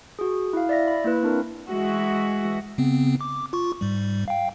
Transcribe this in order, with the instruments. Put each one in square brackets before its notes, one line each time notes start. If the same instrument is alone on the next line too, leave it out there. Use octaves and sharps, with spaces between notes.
[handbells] F#4 G#4
E4 F5
D5 E5 A#6
B5
A#3 E4 B4
C4 D4 A#4
[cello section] E3 G#3 F#4 E5
[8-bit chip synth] C#3 B3 C4
D6
F4 C#6
G#2 G3
F5 G5